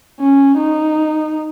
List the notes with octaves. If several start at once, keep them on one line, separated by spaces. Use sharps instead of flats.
C#4
D#4